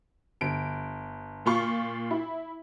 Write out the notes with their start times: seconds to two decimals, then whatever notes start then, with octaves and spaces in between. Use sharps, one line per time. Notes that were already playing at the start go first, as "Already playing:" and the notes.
0.41 G1 D7
1.46 A#2 F4 C#6
2.11 E4